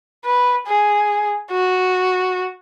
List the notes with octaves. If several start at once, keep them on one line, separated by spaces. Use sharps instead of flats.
B4
G#4
F#4